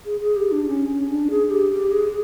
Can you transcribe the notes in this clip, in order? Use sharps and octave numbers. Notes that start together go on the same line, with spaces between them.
G#4
G#4
G4
D4
C#4
C#4
D4
G#4
G4
G4
G#4